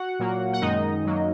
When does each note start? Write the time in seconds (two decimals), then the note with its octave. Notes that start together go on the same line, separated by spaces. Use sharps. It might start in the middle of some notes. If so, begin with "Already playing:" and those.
Already playing: F#4 F#5
0.19 A#2 F#3 A#3
0.53 F#5
0.61 F#2 D#3 G#3 D#4 D#5
1.04 F#2 F#3 A#3